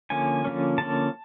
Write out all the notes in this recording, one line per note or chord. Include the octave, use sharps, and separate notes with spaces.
D3 F3 A#3 C#4 G#5
D3 F3 A#3 C#4
D3 F3 A#3 C#4 A5